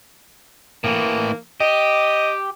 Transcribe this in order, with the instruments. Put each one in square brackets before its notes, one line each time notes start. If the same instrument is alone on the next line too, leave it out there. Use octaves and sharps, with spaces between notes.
[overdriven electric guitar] A2 E3 [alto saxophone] A#3
[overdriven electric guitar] G4 [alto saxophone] D#5